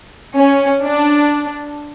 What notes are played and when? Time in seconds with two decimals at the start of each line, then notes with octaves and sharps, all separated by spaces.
0.36 C#4
0.83 D4